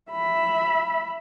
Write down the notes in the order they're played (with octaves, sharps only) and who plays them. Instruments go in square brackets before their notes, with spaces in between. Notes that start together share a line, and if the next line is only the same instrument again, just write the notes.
[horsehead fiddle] E5 B5